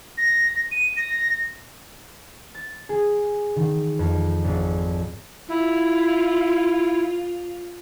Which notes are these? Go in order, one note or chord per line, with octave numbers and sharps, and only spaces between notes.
A#6
D#7
A#6
A6
G#4
D#3
F2
G#1
E4 F4